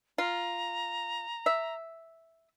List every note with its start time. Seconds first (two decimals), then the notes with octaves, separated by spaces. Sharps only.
0.18 F4 A#5
1.46 E5